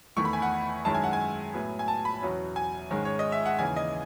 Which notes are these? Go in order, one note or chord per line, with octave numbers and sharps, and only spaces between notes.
E2 D#3 A3 E4 C#6
B5
G#5
F#5
F#2 D#3 G#3 C#4 E4 A5
G#5
F#5
G#5
A2 F#3 B3
G#5
A5
B5
E2 B2 F#3 C#4
G#5
G#2 D#3 G#3 C#4
C#5
D#5
E5
F#5
D#2 C#3 E3 G#5
D#5